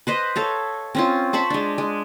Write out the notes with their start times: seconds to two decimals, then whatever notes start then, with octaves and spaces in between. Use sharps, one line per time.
0.07 B4 C5 D#5
0.36 A4 C#5 F5
0.95 C4 C#4 F4
1.33 C5 A5 B5 C#6
1.50 G#3 D4
1.78 G#3